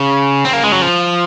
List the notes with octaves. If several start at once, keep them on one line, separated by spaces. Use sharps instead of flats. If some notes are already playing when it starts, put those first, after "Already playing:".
Already playing: C#3
C4
A#3
G#3
F#3
F3